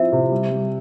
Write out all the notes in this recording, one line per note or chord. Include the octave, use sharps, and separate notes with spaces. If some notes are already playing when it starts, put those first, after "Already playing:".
Already playing: F3 C4 E4 E5
C3
G3
G3